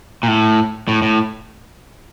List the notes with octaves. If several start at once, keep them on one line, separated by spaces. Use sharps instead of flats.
A#2
A2
A2
A2